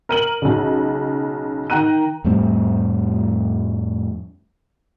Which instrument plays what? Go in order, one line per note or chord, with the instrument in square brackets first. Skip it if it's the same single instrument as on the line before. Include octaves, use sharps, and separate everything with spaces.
[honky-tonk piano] A#4 D#7 F#7
B1 C#3
D#3 G5 A#5 F#6 D#7
[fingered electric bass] F2 A2 G3 C4